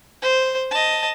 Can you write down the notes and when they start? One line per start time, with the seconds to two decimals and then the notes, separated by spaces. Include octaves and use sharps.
0.22 C5
0.71 D#5 A5